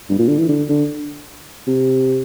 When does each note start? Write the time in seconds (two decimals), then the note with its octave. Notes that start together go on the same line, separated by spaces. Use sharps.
0.10 G2
0.19 A#2
0.28 D3
0.38 E3
0.49 D3
0.69 D3
1.67 C3